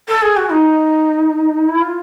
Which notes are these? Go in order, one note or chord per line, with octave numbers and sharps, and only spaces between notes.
A4
G#4
F#4
D#4
E4
F4